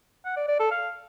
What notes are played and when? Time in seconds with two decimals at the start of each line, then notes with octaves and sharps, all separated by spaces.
0.25 F#5
0.37 D5
0.48 D5
0.60 A4
0.71 F5